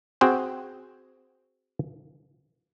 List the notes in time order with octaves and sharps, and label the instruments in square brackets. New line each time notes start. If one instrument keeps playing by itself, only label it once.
[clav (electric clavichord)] C4 F#4 G#4 C5